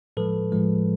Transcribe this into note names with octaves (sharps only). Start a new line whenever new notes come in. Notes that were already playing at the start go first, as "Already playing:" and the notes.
A2 F3 G#3 A4 B4
A2 F3 G#3